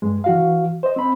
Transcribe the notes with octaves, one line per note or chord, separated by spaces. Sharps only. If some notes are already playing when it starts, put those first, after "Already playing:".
G2 G#3
E3 F#4 F5
C5 D#5
C4 B5